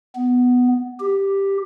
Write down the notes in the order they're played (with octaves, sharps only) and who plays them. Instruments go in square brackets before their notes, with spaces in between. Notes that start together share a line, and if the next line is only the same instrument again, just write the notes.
[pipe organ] B3
G4